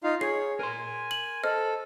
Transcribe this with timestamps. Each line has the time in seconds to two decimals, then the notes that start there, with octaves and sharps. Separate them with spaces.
0.04 D#4 F4 F5
0.21 G#4 C#5 C7
0.59 A#4 G#5 C6
1.11 F#7
1.44 A4 C5 D#5 F6